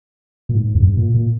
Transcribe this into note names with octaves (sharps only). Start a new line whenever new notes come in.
A#2
G#2
E2
G2
A#2
A#2